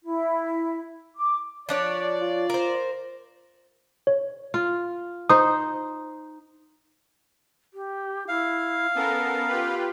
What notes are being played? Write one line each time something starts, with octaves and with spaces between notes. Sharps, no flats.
E4
D6
F3 D4 C#5 D5
F4
A#4 C5
C#5
F4
D#4 C5 D#6
G4
E4 F5
B3 C#4 A4 A#4
F4 G4 B4